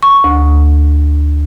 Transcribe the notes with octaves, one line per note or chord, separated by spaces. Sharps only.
C#6
D2